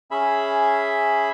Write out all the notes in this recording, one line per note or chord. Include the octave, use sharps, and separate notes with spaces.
C#4 G#4 E5 B5